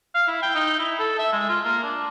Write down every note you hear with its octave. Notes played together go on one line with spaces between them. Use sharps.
F5
E4
G5
D#4
E4
A4
E5
G#3
F4
A#3
D4